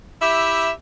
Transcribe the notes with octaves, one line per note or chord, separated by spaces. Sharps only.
E4 G4 E5